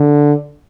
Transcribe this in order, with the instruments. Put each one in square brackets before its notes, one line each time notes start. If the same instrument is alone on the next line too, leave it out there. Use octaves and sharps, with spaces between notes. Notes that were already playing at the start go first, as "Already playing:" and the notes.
Already playing: [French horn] D3